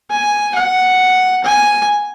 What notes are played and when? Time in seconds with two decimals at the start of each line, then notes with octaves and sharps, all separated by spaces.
0.11 G#5
0.55 F#5
1.44 G#5